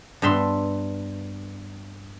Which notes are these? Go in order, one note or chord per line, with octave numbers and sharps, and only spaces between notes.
G2 B3 E5 C6